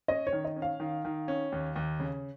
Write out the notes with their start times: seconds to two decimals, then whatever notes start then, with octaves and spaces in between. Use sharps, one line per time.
0.08 C#4 D#5
0.27 C#5
0.32 D#3
0.45 D#5
0.56 C#4
0.62 F5
0.80 D#3
1.05 D#3
1.28 C#4
1.52 D#2
1.75 D#2
2.00 C#3